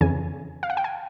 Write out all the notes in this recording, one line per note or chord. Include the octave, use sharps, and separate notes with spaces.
F2 C#3 E3 G#5
F5
F#5
G5
G#5